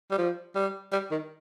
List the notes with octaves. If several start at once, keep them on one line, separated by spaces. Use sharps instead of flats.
G3
F3
G3
G3
D#3